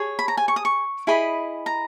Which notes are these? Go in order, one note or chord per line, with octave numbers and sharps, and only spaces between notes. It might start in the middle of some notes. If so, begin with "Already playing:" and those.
Already playing: G#4 C#5
B5
A#5
G#5
C#6
D#6
C#6
E4 G#4 D#5 B5
A#5